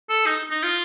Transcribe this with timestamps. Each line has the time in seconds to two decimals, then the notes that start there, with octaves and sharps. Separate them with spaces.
0.09 A4
0.26 D#4
0.50 D#4
0.63 F4